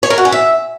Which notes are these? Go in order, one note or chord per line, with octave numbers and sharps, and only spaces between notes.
C#5
A#4
F#4
C#4
E5